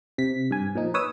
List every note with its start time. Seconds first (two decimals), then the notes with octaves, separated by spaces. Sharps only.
0.18 C3 B6
0.51 G2 G#5
0.75 A#2 F3 D#4
0.94 B4 C#5 D#6 E6